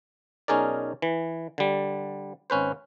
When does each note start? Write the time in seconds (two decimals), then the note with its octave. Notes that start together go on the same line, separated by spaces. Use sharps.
0.48 B1 C#4 D#4 G#4 A#4 D5
1.02 E3
1.58 D3 G3
2.50 G#1 C#4 B4 C5